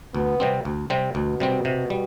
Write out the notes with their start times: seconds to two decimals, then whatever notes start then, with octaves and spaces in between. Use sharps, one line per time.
0.15 D2 B3
0.40 C3 G3 C4
0.65 D2
0.90 C3 G3 C4
1.15 D2 B2
1.40 C3 G3 C4
1.65 C3
1.90 G3